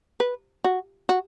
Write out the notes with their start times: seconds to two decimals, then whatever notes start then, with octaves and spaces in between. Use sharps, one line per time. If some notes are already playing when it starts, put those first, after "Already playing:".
0.20 B4
0.64 F#4
1.09 F#4